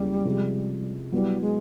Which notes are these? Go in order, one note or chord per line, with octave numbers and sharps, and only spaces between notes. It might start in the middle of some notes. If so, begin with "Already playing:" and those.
Already playing: E2 C#3 F#3 G3 A#3 C#4
C3 F3 G#3
F#3 G3 B3 E4
G#3